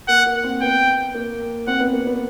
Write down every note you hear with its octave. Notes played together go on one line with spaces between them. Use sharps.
A#3 F#5
A#3
C4
B3 G5
A#3
C4 F#5
B3
A#3
B3